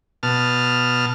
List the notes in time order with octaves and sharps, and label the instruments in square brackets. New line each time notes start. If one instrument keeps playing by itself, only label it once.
[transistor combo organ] B2 A5 F6